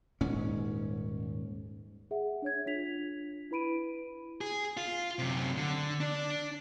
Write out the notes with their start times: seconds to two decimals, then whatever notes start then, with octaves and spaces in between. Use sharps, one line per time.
0.21 D#1 G#2 C#4
2.11 G#4 E5 F#5
2.42 D4 C#5 G#6
2.66 D4 F4 B6 F7
3.51 E4 B4 B5 D7 D#7
4.41 G#4
4.77 F4
5.19 F#2 C3
5.57 D3
6.00 D4 D5